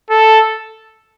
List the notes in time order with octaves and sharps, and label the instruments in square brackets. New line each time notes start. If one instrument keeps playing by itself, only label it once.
[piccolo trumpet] A4